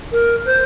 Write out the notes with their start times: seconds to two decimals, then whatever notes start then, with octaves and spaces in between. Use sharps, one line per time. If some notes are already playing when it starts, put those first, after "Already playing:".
0.12 A#4
0.45 C5